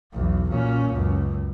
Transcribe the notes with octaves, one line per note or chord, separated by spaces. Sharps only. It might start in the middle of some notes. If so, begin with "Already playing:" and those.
B1 E2
A#2 C#4
C#2 F#2